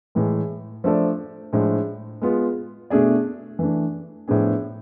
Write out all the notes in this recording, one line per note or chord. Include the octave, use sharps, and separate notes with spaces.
A2 E3 G#3
F3 A3 D4 A4 D5
A2 F3 G#3 D4
G#3 B3 F4
B2 A3 D4 G#4 D5
E3 A3 D4
A2 F3 B3 D4 G#4